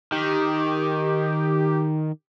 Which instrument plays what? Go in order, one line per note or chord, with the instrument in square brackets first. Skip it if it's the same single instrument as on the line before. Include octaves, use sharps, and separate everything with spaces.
[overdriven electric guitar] D#3 [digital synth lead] G4